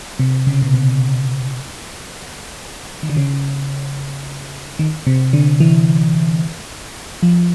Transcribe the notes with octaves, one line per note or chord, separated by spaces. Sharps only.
C3
C#3
B2
C3
D#3
D3
C#3
D#3
C3
D3
E3
F3